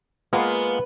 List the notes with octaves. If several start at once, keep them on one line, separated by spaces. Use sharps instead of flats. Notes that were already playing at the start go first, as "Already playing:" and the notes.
G#3 A#3 B3 F4